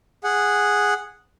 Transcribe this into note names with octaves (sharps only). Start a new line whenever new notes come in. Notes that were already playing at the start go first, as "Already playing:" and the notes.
G#4 F#5